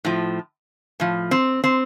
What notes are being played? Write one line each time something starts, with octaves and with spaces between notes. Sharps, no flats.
A2 F3
A2 F3
C4
C4